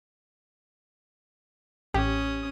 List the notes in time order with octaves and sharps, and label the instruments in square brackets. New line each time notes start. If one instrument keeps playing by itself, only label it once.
[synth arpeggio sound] A1 G4 [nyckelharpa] C#4 D#6